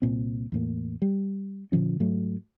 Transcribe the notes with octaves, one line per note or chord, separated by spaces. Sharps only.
C2 A#2 C4
E2 A2 A#3
G3
A#2 D3 F3 C#4
G#2 F#3 A3